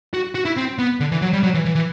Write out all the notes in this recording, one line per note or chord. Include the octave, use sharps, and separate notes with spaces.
F#4
F#4
E4
C4
B3
D3
E3
F#3
G3
F#3
E3
E3
E3